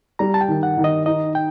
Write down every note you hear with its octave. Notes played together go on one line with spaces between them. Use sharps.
G3 A#5
A5
G5
D#3
F#5
D#3
D#5
D#4 D#5
G5